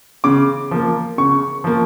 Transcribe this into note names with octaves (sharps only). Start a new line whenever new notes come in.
C#3 D6
F3 A#3
C#3 C#6
F3 A#3